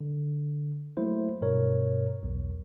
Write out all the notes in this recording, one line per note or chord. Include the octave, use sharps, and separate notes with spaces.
D3
F#3 A3 A#3 E4 C5
G2 B2 A#4 C#5
B1 E2